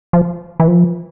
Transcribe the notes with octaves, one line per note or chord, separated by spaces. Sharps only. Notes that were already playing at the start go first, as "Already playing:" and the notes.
F3
E3
F3